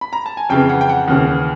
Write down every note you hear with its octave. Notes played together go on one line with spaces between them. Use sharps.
B5
A#5
A5
G#5
F2 C#3 E3 G5
F#5
G5
F#5
D#2 C#3 E3